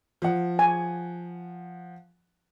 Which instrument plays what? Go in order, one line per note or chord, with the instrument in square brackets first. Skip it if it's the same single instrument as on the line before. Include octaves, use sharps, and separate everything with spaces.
[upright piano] F3 F#5
[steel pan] G#5